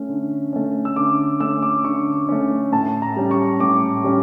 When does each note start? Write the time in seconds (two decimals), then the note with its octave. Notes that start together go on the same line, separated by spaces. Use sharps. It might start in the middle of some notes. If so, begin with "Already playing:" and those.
Already playing: A3 C#4
0.09 D3
0.53 A3 C#4
0.85 E6
0.96 D3 D6
1.40 A3 C#4 E6
1.63 D6
1.84 D3 C#6
2.29 A3 C#4
2.72 A2 A5
3.02 A#5
3.17 G3 C#4
3.31 C#6
3.60 A2 D6
4.04 G3 C#4